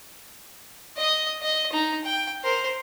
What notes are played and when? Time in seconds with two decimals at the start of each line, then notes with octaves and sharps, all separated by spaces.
0.97 D#5 D#6
1.41 D#5
1.72 D#4 A#5
2.04 G5
2.43 A#4 C5